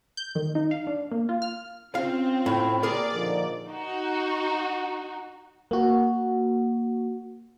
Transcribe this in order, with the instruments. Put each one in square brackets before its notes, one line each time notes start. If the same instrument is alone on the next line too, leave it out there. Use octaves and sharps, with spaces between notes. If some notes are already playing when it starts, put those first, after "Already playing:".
[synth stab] G6
D#3
D#4
F5
D4
A#3
F4
F6
[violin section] C4 [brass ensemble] C#4 [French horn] F4 [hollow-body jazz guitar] F5
[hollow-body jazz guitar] A2
[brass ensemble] A#3 [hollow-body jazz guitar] G#4 A#4 [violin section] D5
[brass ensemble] A#2 F3 D#4 [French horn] D3
[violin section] D#4 F#4
[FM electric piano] A#3 F#4